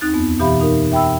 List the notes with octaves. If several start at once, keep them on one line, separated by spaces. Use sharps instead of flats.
D#2 C4 D#4 F#6 A6
F2 B3 C4
B2 E3 G4 E5 F5 B5
D#4 A#4
E5 G5 B5 E6